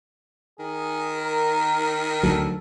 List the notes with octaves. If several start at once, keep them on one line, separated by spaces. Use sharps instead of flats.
D#3 G#4
A#4
D2 F#3 A4